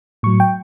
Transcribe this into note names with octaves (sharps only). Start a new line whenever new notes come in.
A2 F#3 C#6
G5